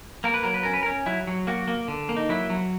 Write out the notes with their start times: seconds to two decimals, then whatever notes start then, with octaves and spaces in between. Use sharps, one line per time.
0.24 A#3 A#4
0.34 B4
0.43 F#3 A#4
0.54 B4
0.63 C#4 A#4
0.74 B4
0.83 A#4
0.86 C#4
1.06 F#3 E4
1.27 F#3
1.47 A#3 F#4
1.68 A#3
1.88 D3
2.09 A#3
2.17 D#4
2.29 F#3 E4
2.50 F#3